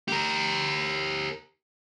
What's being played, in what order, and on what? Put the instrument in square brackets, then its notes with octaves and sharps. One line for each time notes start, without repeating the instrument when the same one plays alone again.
[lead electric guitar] G4 A#4